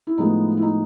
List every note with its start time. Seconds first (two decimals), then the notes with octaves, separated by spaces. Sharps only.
0.07 E4
0.18 A2 F3 G#3 B3 D#4
0.57 E4
0.62 D#4